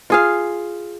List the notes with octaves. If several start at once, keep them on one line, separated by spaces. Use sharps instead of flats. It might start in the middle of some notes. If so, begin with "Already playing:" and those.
F4 G#4 F5